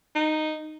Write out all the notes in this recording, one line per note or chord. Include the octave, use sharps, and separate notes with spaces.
D#4